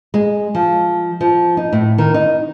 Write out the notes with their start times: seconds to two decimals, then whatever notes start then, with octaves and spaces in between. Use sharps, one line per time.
0.14 G#3
0.55 F3
1.21 F3
1.57 D#4
1.73 A2
1.98 D#3
2.14 D#4